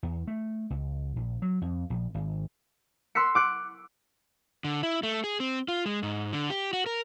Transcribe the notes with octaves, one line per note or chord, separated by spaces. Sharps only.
E2
A3
C#2
A#1
F#3
F2
A#1
G#1
C6 E6 F#6 B6 C#7
D6 F#6 C#7
D3
E4
A3
G#4
C4
F4
G#3
G#2
D3
G4
F#4
A#4